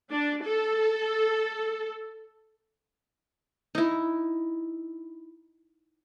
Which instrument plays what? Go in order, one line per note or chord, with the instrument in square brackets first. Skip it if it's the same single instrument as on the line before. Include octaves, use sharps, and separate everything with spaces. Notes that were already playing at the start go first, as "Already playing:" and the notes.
[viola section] D4
A4
[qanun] D#4 E4